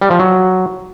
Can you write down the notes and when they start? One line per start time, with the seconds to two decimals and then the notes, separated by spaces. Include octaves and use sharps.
0.01 G3
0.10 F3
0.19 F#3